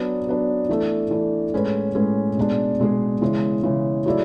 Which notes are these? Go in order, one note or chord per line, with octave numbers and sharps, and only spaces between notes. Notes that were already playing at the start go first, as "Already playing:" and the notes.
Already playing: F#3 B3 D4
F#3 B3 D4
E3 A3 D4 A4
E3 A3 D4 A4
A2 G#3 C#4 G#4 B4
A2 G#3 C#4 G#4 B4
B2 G#3 D4 G#4
B2 G#3 D4 G#4
C#3 E3 G#3
C#3 E3 G#3
F#3 A3 E4 G#4 D5